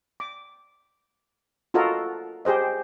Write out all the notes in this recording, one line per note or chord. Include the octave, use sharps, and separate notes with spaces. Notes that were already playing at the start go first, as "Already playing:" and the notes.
D6
F4 F#4 A4 A#4 D#5
G4 G#4 C5 D#5